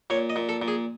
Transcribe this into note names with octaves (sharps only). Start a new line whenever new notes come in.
A#2 C#5
D#5
A#2
A4
A#2
G#4